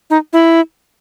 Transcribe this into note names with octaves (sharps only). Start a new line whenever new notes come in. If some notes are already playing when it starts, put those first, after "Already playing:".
D#4
E4